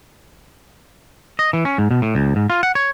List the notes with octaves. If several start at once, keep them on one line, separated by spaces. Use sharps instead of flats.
D#5
E3
C#4
G#2
B2
A2
C#2
G#2
F4
F#5
C#5